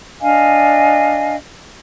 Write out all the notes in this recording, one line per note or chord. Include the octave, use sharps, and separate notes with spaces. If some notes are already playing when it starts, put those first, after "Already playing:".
D4 D#5 F5 G#5